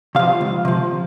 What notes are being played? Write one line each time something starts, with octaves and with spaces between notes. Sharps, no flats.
C3 F3 F5
C#2
C3 F3